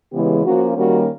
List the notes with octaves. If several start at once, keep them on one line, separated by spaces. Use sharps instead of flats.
C#3 E3 G#3 B3 G4
F3 A#3 C#4 F#4
D#3 G3 A#3 C#4 F#4